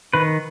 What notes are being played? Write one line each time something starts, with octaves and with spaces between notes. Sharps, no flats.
D#3 B4